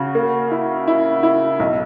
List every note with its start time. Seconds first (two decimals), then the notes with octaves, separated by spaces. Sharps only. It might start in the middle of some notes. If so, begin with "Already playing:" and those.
Already playing: C#3 F#4
0.15 A#3
0.51 E4
0.88 E4
1.23 E4
1.60 B1